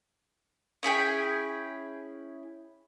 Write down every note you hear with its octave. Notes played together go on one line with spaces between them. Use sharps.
C#4 E4 G#4 G5